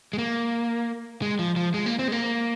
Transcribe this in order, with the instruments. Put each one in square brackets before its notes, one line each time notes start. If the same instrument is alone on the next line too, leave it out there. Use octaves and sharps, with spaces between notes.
[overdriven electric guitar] G#3
A#3
G#3
F3
F3
G#3
A#3
C4
G#3
A#3